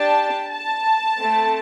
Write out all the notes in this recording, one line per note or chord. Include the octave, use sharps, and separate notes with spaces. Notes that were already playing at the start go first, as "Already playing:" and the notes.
Already playing: D4 G4 A5
A5
A3 C4 A4